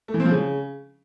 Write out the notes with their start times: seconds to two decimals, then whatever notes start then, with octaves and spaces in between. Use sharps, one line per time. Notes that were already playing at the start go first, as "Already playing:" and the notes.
0.08 A3
0.14 E3
0.20 C4
0.25 F3
0.31 C#3